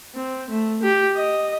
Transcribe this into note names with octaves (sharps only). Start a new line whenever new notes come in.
C4
A3
G4
D#5